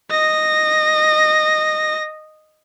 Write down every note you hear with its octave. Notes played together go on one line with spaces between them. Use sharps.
D#5 A#6